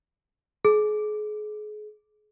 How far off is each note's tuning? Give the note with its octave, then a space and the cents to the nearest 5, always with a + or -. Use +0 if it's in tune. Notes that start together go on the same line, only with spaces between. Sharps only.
G#4 +35